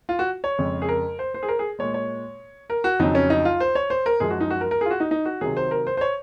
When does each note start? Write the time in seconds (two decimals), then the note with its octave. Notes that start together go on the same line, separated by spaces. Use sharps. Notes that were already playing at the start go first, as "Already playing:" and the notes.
0.09 F4
0.19 F#4
0.44 C#5
0.58 F2 C#3 F3 G#3
0.82 G#4
0.89 A#4
1.19 C5
1.34 C5
1.43 G#4
1.48 A#4
1.59 G#4
1.79 A#2 G#3 C#5
1.94 C#5
2.70 A#4
2.84 F#4
2.99 F2 C#3 F#3 D#4
3.15 C#4
3.30 D#4
3.45 F4
3.60 C5
3.75 C#5
3.90 C5
4.06 A#4
4.20 F#2 F3 G#3 G#4
4.30 F#4
4.41 D#4
4.50 F#4
4.61 A#4
4.71 A#4
4.81 G#4
4.86 F4
4.91 F#4
5.00 D#4
5.11 D#4
5.25 F#4
5.41 C3 D#3 F#3 G#4
5.57 C5
5.71 A#4
5.87 C5
5.97 C5
6.01 C#5